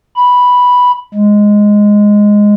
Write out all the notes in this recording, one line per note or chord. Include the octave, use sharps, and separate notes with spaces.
B5
G#3